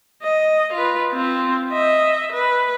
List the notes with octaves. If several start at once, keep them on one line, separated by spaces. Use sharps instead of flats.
D#5
F4 B4
C4 F4
D#5 E5
B4